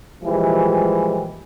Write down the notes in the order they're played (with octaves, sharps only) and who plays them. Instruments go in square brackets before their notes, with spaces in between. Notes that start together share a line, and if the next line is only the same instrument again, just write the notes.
[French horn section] A#2 E3 F3 G3 G#3 G4